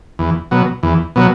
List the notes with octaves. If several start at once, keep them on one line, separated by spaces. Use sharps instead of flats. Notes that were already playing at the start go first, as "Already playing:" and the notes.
E2
B2 F#3
E2
B2 F#3